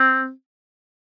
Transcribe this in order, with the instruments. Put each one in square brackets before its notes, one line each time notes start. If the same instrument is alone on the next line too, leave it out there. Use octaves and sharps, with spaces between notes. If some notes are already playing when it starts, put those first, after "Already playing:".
Already playing: [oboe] C4